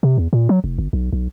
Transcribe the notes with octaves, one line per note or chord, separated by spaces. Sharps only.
C3
E2
A#2
F#3
F1
G1
B1
B1